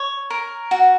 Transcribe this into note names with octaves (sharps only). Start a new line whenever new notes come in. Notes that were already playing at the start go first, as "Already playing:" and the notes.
Already playing: C#5
A#4
F#4